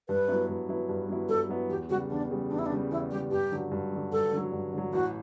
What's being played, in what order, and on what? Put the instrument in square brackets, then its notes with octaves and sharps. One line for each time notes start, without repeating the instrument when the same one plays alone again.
[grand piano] G2 [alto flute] B4
[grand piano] F#3 B3 E4
G2
F#3 B3 E4
G2
F#3 B3 E4
[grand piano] G2 [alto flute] A4
[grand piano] F#3 B3 E4
[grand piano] E2 [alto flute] G4
[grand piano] C#3 G3 [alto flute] F#4
[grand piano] E2 [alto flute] D4
[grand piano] C#3 G3
[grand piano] E2 [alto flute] D4
[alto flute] E4
D4
[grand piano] C#3 G3
[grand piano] E2 [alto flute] E4
[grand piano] C#3 G3 [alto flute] G4
[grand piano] G2 [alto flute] G4
[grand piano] D3 F#3
G2
D3 F#3
[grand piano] G2 [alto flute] A4
[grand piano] D3 F#3
G2
D3 F#3
[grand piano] A1 [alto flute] F#4